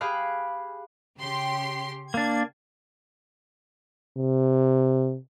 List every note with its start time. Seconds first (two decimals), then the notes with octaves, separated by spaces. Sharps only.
0.01 G4 G#4 F5 B5 F#6
1.19 C#3 G4 C6
2.14 A#3 D4 G#6
4.17 C3